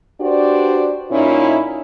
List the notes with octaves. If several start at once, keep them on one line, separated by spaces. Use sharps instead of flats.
D4 F#4 G4 B4 C5 D5
A#2 C#4 D#4 E4